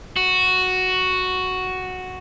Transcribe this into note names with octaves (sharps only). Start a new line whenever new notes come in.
F#4